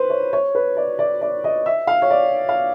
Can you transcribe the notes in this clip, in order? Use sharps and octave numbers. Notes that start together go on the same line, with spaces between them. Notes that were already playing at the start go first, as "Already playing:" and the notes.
Already playing: B4 C5
C#5
C#5
B4
D5
D5
D5
D#5
E5
F5
C#5
D5
F5